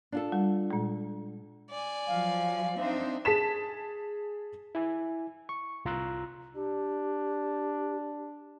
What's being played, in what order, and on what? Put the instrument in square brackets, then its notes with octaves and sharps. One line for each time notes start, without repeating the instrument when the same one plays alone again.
[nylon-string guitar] D4 F4 A4
[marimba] G3
A#2 G#3
[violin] D5 G#5
[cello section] F3 F#3 [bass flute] F5
[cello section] C4 D#4 C5 [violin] D4 E5
[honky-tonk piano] G#4 A5 B6 E7
[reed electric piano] E4 G#5
C#6
C2 F4 A#5 C6 E6 F#6
[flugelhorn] D4 [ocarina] G4